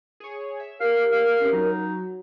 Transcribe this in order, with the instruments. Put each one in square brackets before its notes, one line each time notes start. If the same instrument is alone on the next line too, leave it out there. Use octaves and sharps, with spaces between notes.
[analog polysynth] G#4 C#5
E5
[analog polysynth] G4 [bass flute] A#4 [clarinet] F5
[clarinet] F5
[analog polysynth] C4 C#4 G4
[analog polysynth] F#3 [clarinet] D#4